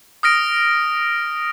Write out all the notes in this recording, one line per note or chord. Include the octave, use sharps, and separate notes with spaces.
D#6 F6 A#6 D7